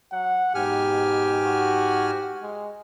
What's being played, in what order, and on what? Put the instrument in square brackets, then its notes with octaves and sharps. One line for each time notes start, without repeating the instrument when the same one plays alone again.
[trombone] F#3 [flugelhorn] F#5
[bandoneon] G#2 G#5 F6 [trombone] B2 [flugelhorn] G4
[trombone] F#4
G#3